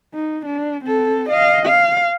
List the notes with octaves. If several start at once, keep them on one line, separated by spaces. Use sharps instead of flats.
D#4
D4
C4 A4
D#5 F5
F5